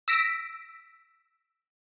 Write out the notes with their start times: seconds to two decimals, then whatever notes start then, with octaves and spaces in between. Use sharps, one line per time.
0.08 E6 A#6 B6 D7